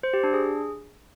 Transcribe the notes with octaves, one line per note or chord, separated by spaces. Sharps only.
C5
G4
D4
G#4